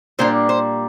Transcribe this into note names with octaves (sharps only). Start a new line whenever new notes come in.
A#2 G3 A#3 D4 C5
C5